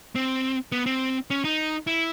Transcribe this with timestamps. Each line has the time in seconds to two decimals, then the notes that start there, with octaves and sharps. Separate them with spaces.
0.15 C4
0.72 B3
0.86 C4
1.30 C#4
1.44 D#4
1.87 E4